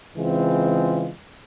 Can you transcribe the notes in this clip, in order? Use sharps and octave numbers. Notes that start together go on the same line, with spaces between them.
C#3 E3 G#3 C4 F4